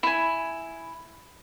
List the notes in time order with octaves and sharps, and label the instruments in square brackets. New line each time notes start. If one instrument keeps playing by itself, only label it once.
[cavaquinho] E4 G#5